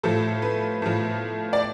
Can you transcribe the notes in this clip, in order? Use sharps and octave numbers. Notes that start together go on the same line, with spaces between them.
A2 F3 A4
B4
A2 F3
D5